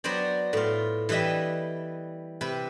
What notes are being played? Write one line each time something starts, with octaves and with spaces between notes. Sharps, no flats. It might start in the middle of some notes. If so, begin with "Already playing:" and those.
F#3 B3 F#4 C5 D5
A2 F4
E3 G3 B4 D#5 E5
C3 B4 B5